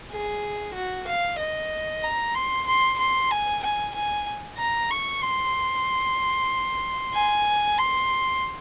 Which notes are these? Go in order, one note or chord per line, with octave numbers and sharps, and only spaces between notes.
G#4
F#4
F5
D#5
A#5
C6
C6
C6
G#5
G#5
G#5
A#5
C#6
C6
G#5
C6